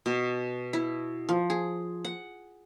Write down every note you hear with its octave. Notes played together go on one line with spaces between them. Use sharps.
B2
E4
F3
G#4
F#5